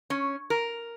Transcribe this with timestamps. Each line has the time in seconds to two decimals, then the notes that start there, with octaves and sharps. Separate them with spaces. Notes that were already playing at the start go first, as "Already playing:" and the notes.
0.10 C#4
0.50 A#4